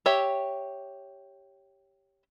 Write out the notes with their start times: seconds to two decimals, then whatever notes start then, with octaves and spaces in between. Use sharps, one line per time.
0.06 G4 C#5 E5